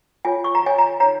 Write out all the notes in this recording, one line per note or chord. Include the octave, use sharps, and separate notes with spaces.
F4 C#5 G#5
C#6
A#5
F4 C#5 G#5
A#5
D#4 C#5 A#5